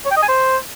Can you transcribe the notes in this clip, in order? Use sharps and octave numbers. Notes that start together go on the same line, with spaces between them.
C#5
G5
D#5
G#5
C5